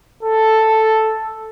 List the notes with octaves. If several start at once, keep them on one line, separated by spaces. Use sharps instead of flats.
A4